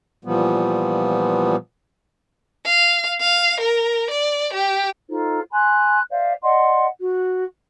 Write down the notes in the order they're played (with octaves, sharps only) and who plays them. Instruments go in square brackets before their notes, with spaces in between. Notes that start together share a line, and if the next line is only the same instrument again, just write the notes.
[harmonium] A#2 E3 F3 G3 B3
[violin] F5
F5
A#4
D5
G4
[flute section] D#4 F4 A4 C5
G#5 B5 C6 F#6
C5 D5 E5 F5
D5 D#5 F#5 C6
F#4